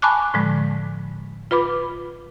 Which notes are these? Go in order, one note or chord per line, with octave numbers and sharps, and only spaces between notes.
G#5 A5 B5 C#6 D6 F#6
A2 D3 F3 G#3
F4 B4 B5 D6